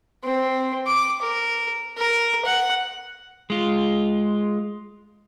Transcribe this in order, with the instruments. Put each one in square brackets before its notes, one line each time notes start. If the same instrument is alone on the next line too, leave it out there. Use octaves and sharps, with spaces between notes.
[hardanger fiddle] C4
D6
A#4
A#4
F#5
[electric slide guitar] G#3 F4